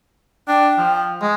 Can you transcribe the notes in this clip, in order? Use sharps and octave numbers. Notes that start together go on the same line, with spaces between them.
D4 G5
F3
G#3